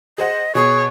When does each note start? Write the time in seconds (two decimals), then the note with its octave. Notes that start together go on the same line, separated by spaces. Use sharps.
0.18 G#4 C5 D#5 F#5
0.55 B2 G#4 C#5